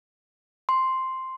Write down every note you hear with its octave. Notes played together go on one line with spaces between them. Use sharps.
C6